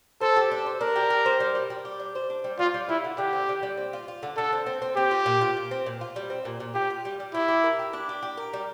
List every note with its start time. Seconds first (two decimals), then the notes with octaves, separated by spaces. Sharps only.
0.21 A4 C5
0.36 G4
0.51 D4
0.66 C5
0.81 D4 A#4
0.96 G4
1.10 G4
1.26 C5
1.40 G3
1.55 G3
1.70 G3
1.85 G4
2.00 D4
2.15 C5
2.30 D4
2.44 G3
2.59 G3 F4
2.74 G3
2.89 G3 E4
3.04 D3
3.18 D3 G4
3.33 C4
3.49 D3
3.63 G3
3.77 C4
3.93 F4
4.08 F4
4.23 D3
4.37 D3 A4
4.53 C4
4.66 C4
4.82 C4
4.96 C4 G4
5.11 F4
5.26 A#2
5.41 F4
5.57 A#2
5.71 C4
5.86 A#2
6.01 F4
6.16 G3
6.30 C4
6.45 A#2
6.60 A#2
6.74 F4 G4
6.90 F4
7.05 G3
7.20 G3
7.34 E4 G4
7.48 G4
7.64 A#4
7.79 G4
7.93 D4
8.09 G4
8.23 G4
8.37 A#4
8.53 G3